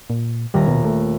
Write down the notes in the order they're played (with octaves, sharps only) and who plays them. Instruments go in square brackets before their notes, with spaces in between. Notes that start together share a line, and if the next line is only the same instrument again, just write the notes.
[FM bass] A#2
[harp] D#1 A#5 [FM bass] G3
[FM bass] B2
A3